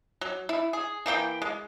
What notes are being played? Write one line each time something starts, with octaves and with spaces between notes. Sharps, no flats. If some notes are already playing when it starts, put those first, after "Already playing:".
F#3
E4
G#4
E3 A#3 G4 G5
G#3